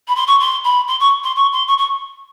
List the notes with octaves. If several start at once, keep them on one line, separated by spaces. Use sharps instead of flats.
B5
C6
C#6
C6
B5
C6
C#6
C6
C#6
C6
C#6
C#6